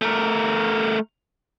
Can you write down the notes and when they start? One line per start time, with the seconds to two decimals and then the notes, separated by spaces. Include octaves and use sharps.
0.02 A3 A#4